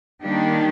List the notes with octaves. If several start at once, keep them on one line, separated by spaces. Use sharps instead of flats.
D#3 G3 A#3 D4 G4